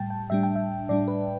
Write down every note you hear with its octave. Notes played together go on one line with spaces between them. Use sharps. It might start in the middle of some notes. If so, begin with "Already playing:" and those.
Already playing: A2 G3 G5 A5
G5
A2 G3 D4 E5
G5
E5
A2 G3 D4 D5
B4